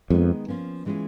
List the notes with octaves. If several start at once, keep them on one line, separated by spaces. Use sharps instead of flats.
F2 D#3 G#3 B3
F3 A#3 C#4
E3 G#3 C#4 F4 G#4